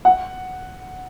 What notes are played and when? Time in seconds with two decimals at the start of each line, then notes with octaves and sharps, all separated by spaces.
0.05 F#5